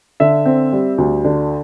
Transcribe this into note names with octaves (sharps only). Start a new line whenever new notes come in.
D3 E5
C4
G3
D2
D3